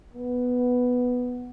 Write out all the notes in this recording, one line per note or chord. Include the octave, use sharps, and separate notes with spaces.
B3